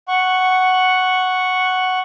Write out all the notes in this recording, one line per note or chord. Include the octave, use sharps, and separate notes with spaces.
F#5 C#6